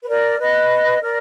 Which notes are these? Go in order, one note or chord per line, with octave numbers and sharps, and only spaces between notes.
B4
A#4 D5
B4 D#5
A#4 D5